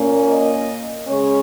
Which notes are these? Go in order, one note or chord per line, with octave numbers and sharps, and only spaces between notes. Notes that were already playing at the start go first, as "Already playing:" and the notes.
Already playing: A#2 A#3 C#4
D#5
C#3 G#3 C#4 C#5